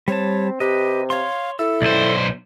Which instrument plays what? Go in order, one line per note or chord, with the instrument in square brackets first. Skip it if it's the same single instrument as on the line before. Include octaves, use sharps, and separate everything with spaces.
[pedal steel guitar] G3 A5 [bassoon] C4 [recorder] C#5
[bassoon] C3 [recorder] G4 [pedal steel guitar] B4 D#5
[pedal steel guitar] C#5 C6 [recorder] F5
[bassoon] E4 [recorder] A4 [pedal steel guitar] E6
[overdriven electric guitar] B1 C5 [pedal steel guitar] D5